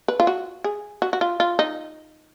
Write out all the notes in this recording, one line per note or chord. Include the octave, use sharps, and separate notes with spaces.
B4
F4
F#4
G#4
F#4
F#4
F4
F4
D#4